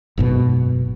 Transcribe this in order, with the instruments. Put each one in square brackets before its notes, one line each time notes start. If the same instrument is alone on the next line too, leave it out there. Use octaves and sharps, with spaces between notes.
[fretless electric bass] F#1 G#2 B2